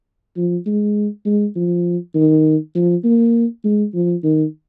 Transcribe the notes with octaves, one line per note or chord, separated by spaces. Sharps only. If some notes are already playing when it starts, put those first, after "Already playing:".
F3
G#3
G#3
F3
D#3
F3
A#3
G#3
F3
D#3